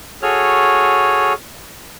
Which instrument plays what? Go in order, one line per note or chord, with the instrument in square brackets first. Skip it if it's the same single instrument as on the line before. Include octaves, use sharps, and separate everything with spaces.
[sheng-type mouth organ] F#4 G#4 A4 C#5 F6